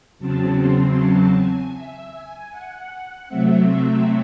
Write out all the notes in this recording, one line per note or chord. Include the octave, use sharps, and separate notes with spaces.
E2 C#3 F#3 C4 A5
C6
A5
G#5
E5
G#5
F#5
C3 F#3 A3 C4 E5
E5